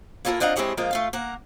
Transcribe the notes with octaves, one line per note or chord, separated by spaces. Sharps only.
A#3 E4 F4 G4 A4 A#4
C4 D4 F4 D#5 F#5 A#5
G#3 C4 E4 G4 G#4 C#5
F3 G#3 A#3 F4 A#4
A3 F4 F5
A#3 A#4 F#5